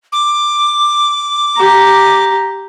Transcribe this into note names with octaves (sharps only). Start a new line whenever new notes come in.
D6
G4 A#5